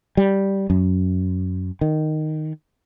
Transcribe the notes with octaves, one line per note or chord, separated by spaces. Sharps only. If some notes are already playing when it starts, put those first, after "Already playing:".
G3
F#2
D#3